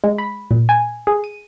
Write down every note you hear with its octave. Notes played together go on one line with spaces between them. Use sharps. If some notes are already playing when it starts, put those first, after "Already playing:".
G#3
B5
A#2
G#5
G#4
D#7